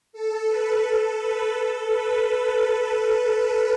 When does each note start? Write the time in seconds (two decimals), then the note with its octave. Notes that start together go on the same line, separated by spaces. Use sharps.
0.13 A4
0.48 B4
0.83 A4
1.19 B4
1.54 A4
1.89 B4